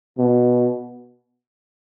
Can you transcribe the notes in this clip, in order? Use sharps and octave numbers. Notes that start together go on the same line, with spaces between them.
B2